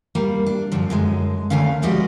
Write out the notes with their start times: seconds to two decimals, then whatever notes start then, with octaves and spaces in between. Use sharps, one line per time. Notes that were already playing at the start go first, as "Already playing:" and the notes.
0.15 G3 A#3
0.46 D4
0.72 F#2 D3 F3
0.90 F#2 D3 G#3
1.50 D2 D3 D#3 C#4 F5
1.82 F3 G3 G#3 F#4 G4 D#5